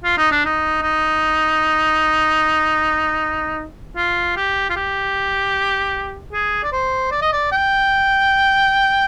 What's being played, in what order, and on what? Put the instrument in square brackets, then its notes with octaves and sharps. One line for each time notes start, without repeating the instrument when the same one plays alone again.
[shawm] F4
D#4
D4
D#4
D#4
F4
G4
F4
G4
G#4
D5
C5
D5
D#5
D5
G5